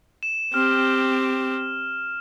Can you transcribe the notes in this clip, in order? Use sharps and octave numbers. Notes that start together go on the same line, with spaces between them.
E7
C4 G4 F6